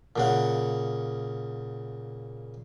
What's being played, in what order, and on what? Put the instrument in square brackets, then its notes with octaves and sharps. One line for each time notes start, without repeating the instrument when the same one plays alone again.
[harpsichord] A#2 C#3 F#5